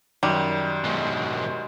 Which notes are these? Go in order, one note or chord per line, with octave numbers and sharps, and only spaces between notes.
F#2 D#3 G3 D#4
G#2 B2 G#3 F#4